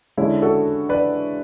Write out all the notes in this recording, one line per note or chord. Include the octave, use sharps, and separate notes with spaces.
D3 G#3 C#4 E4
F#4 A4
B4 D5